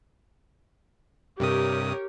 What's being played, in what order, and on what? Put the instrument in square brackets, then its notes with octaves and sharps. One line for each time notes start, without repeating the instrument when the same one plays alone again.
[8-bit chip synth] G2 C3 D#6 [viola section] G4 A#4 C#5